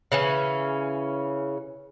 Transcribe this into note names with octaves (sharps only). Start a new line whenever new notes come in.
C#3 E3 C#4